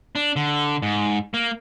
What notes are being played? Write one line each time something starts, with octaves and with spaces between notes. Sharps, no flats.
D4
D3
G#2
A#3